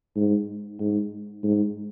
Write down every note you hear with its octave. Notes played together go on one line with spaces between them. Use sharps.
G#2
G#2
G#2